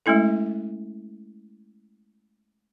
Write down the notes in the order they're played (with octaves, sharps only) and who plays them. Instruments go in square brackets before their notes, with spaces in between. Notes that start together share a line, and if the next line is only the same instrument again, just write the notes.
[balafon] G#3 A3 C#4 E4 A4